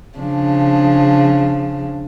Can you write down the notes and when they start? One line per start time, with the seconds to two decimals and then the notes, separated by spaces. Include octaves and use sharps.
0.18 C#3 F3 D4